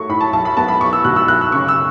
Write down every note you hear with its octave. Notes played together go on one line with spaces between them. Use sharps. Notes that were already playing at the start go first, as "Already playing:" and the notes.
Already playing: F#3 A3 C#6
A2 B5
A5
B1 A5
B5
B3 A5
B5
B1 C#6
E6
B2 F#6
E6
B1 F#6
E6
C#3 C#6
E6